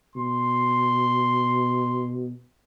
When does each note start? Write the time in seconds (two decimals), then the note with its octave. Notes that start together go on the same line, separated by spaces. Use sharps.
0.16 B2 C6